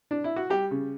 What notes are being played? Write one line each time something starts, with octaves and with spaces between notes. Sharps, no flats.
D4
E4
F#4
G3 G4
C#3